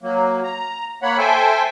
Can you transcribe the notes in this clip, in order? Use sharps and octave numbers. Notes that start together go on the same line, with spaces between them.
F#3 A#3
A#5
A#3 C#5 F#5 B5
A4 C5 E5 G5 G#5